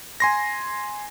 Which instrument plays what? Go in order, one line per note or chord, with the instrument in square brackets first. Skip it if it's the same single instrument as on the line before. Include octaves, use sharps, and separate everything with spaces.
[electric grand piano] G#5 C6 A#6